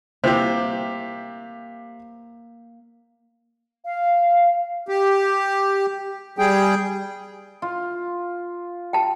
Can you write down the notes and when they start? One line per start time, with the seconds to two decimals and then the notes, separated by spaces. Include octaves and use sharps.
0.24 C3 E3 A#3 G4
3.84 F5
4.88 G4
6.38 G3 G#4 G5
7.62 F4
8.93 G5 A5